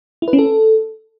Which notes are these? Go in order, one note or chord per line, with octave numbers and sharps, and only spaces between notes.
E4
B4
C#4
A4